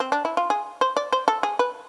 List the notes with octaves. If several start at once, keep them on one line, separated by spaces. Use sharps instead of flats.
C4
D4
E4
F4
G#4
C5
D5
C5
A4
G#4
B4